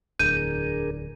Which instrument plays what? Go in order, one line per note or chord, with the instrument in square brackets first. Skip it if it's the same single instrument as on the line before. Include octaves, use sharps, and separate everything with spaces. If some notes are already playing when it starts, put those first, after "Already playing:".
[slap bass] D1 E2 [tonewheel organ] D4 G#4 A#4 [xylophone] G6 [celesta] D#7